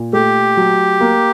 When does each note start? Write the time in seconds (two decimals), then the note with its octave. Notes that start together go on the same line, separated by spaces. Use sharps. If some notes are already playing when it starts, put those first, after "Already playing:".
Already playing: A#2
0.13 A3 G4
0.57 F#3
1.01 A#3